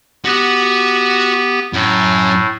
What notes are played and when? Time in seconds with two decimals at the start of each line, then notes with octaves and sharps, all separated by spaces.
0.25 B3 F#4 G4 F#5
1.73 F#2 A2